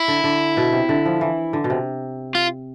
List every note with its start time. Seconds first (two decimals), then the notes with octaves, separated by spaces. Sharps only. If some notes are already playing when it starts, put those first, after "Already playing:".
Already playing: E4
0.08 D3
0.24 D3
0.57 B2
0.73 C3
0.89 D3
1.05 F3
1.21 E3
1.53 D3
1.64 B2
1.70 C3
2.35 F4